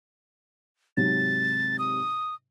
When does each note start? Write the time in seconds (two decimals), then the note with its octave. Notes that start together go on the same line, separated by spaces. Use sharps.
0.97 G#2 C3 F#3 A6
1.79 D#6